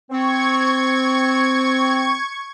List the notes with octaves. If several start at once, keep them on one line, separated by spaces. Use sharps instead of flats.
C4 C#6 G#6